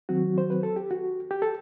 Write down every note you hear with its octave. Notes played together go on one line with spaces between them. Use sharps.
D#3 F#3 C4 F#4
C5
B4
A4
G4
F#4
G4
A4